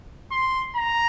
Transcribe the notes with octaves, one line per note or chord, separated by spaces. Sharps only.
C6
A#5